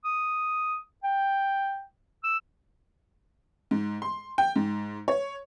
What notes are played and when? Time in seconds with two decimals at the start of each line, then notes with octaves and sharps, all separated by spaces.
0.04 D#6
1.04 G5
2.24 E6
3.71 G#2
4.02 C6
4.38 G5
4.56 G#2
5.08 C#5